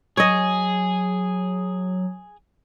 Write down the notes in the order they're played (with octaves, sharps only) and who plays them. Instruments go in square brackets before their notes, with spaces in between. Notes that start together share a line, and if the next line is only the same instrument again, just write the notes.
[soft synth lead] F#3 [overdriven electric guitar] G#4 [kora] C#5 D#5